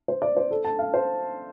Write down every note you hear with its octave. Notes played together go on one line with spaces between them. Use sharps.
C5
D5
C5
A4
A5
F5
C5